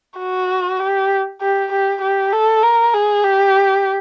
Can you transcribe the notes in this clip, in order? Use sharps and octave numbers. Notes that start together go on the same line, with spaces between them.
F#4
G4
G4
G4
G4
A4
A#4
G#4
G4